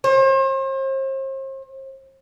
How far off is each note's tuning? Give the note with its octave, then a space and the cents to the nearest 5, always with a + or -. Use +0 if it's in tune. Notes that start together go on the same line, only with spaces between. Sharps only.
C5 +40